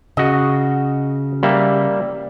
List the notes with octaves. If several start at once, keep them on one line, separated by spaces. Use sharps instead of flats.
C#3 F#4 D#5
G3 A#3 E5